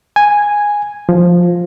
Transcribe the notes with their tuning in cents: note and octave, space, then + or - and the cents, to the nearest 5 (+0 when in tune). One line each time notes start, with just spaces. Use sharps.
G#5 -5
F3 +5